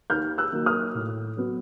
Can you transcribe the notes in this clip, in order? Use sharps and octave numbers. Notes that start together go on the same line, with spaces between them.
D#2 F6 G6
E6 F#6
D#3 F#3 A#3
D#6 F6
A2
F#3 B3